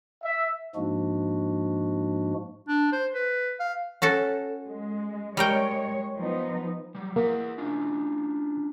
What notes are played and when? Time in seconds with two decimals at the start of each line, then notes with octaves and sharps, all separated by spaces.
0.23 E5
0.75 G#2 F3 G#3 A#3 D4 F#4
2.68 D4
2.92 C5
3.15 B4
3.60 F5
4.02 C#4 F#4 A4
4.67 G#3
5.37 G3 G#3 A#4 C#5 G5
6.20 F3 B3 D#4
6.95 F#3 G3
7.16 A#3 G#4 E5 F#5
7.58 C#4 D4 F4